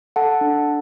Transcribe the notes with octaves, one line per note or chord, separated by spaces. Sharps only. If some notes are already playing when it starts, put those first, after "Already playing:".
A4 F#5 A5
D4